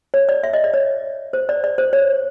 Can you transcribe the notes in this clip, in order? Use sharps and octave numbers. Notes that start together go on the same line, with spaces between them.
C#5
D5
E5
D#5
D5
C#5
C5
D5
D5
C5
C#5